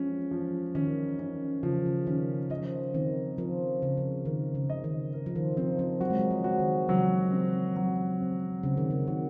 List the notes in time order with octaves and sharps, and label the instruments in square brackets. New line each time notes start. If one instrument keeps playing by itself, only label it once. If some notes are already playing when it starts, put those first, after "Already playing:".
Already playing: [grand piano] F3 G#3 C#4
F3
[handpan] D#3 [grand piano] C#4
[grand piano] C#4
[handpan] C#3 [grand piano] F3
[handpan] C#3
[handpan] D#3 [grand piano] C#4
[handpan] F3 [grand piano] D#5
[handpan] D#3 [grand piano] C4
[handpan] F3 [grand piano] A#4
[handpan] C#3 [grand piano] A#4
[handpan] C#3
[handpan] D#3 [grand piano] A#4
[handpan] C#3
[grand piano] D#5
[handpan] D#3
[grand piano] A#4
[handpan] F3
D#3
[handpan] F3 [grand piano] C4
[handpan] F3
[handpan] F#3 [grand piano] F#4
[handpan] G#3
F#3
F3
[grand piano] F#4
[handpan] D#3
[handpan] C#3 [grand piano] F#3
[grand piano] C4
F#3
C4
[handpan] C#3 [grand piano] C4
[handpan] D#3
C#3
[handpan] D#3 [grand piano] F#4